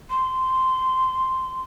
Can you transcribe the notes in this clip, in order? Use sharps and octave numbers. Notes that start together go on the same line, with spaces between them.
C6